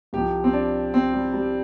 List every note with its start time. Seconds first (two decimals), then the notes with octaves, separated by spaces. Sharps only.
0.13 C2 C3 F3 G4
0.44 C4
0.53 D4
0.94 C4
1.13 G3
1.33 G3